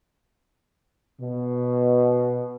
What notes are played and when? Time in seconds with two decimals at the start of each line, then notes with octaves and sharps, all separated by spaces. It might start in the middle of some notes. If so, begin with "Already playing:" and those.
1.21 B2